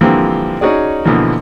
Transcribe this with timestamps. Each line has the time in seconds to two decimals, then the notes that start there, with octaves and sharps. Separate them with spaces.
0.01 D3 E3 F3 G3 A#3 C4
0.61 C#4 D#4 F#4 G#4 D5
1.05 B2 D3 E3 F3 A#3